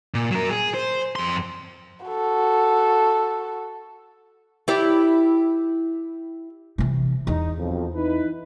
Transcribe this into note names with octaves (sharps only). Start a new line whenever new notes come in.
A#2
F#3 A#4
G#4
C5
F2 C6
F#4 A4
E4 G4 D5
C3 E3
E2 D#4
B1 F2 F3
D#4 E4 B4